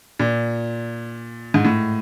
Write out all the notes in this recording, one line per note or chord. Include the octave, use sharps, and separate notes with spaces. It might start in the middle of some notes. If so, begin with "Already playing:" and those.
A#2
G#2
A2